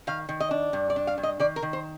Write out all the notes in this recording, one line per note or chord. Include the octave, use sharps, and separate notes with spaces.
D#3 F5
D#3
D#5
D4
G2
D5
D4
F5
G2
D#5
D#3 D5
A#4
D#3
C5